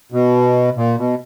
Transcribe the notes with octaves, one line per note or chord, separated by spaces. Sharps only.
B2
A#2
B2